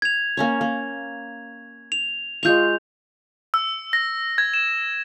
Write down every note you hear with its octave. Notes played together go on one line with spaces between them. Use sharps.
G#6 F7
A#3 C#4 C#5
A#3
F7
G#3 F4 C#6 G6 F7
E6
A#6
G#6
E7